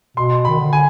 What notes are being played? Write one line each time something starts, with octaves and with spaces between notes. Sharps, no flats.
B2 C6
B5
D#3
D3
G#5